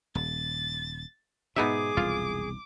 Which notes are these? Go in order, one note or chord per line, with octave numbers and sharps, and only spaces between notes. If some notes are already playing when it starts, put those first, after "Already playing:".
D#1 A6
G#2 B2 B3 D#4 G#4 E5 D6
E1 C2 F2 F4